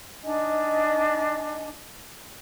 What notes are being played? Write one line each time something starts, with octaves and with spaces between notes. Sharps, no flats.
D4 D#4 D#5 G#5